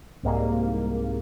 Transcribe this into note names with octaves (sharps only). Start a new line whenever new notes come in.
C2 G#2 A#3